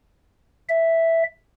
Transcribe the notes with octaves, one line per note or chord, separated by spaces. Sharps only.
E5